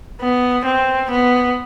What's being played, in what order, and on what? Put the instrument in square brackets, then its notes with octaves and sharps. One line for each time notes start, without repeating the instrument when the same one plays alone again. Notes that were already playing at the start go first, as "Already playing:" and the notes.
[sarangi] B3
C4
B3